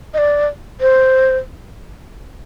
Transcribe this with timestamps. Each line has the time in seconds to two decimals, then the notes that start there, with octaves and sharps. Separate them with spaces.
0.14 D#5
0.18 D5
0.81 C5